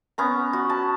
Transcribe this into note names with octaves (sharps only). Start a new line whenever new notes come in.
B3 C#4 A#5
F#4
A5